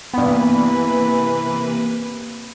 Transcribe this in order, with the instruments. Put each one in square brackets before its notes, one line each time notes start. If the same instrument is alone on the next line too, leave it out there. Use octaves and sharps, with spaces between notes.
[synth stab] G2 B3 [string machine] C3 A#3 B4 [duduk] E3 [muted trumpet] B5